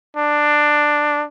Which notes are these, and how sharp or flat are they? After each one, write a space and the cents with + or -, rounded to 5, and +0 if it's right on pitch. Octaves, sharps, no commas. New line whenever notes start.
D4 +10